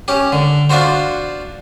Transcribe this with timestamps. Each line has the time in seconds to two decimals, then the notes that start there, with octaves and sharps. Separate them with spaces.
0.08 C#4 G4
0.32 D3
0.70 D4 F4 F#4 C5